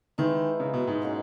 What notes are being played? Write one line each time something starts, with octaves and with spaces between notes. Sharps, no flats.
D#3 E3 G#3 D#4
C#3
B2
G#2
B2 A#3 C#4 G#4